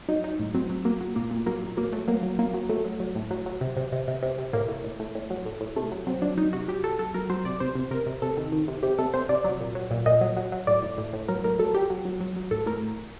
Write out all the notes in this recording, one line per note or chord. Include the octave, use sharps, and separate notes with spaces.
F#3 D#4
F#3 D#4
A2
F#3 C4
F#3
F#3 A#3
F#3
A#2 A#3
A#2
F#3 A#3
A#2
F#3 A#3
F#3 A3
F#3 A#3
F#3
F#3 A#3
F#3
F#3 A3
F#3
F#3
A2
F#3
F#3
C3
C3
C3
C3
C3
C3
A2 A#3
A2
A2
A2
A2
F#3
A2
A2
C3 A3
F#3
F#3 C4
F#3 D4
F#3 D#4
C3 F#4
F#3 G4
F#3 A4
F#3 A4
F#3 A#4
F#3 C5
C3 D5
C3 C5
C3
C3 A#4
C3
C3 A4
D#3
D#3
C3
C3 G4
C3 A4
C3 C5
C3 D5
F#3
A#2
F#3
A#2
A#2 D#5
F#3
F#3
F#3
A2 D5
A2
A2
A2
F#3 A#4
A2 A#4
F#3 A4
F#3 G4
F#3
F#3
F#3
F#3
A2 A4
A2 A#4